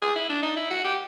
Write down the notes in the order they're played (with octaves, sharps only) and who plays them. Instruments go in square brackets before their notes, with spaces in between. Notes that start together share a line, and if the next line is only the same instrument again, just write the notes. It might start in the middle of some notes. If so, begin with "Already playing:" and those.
[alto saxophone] G#4
E4
D4
D#4
E4
F#4
G4